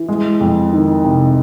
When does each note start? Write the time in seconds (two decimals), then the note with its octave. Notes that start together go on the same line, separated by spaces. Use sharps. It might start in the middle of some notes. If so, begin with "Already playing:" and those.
Already playing: E3
0.08 G#3
0.40 F2
0.73 D#3
1.04 C3